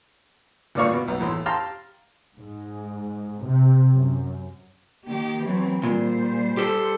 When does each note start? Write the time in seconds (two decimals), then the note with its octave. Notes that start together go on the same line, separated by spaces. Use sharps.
0.75 D2 G2 A#2 D5 F5 C#6
0.93 B2
1.08 B1
1.20 E2 A2 C6
1.46 G4 F5 G5 A5 A#5 C6
2.39 G#2
3.45 C3
3.96 F#2
5.08 D#3 A#3 G4
5.44 E3 F#3 C4
5.83 A#2 G3 C5
6.57 G4 A4